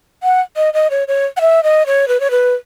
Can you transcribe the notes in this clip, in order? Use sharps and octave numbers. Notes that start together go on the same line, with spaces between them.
F#5
D#5
D#5
C#5
C#5
F#5
E5
D#5
C#5
B4
C#5
B4